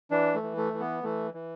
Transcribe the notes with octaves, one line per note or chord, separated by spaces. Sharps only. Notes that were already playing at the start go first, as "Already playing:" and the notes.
E3 D4
A3
E3
A3
E3
B3
E3 A3
E3